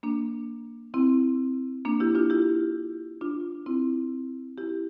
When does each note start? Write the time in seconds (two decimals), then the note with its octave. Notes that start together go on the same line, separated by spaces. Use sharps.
0.03 A#3 D4
0.94 C4 E4
1.85 A#3 D4
2.00 E4 G4
2.15 D4 F4
2.30 E4 G4
3.21 D4 F4
3.66 C4 E4
4.58 E4 G4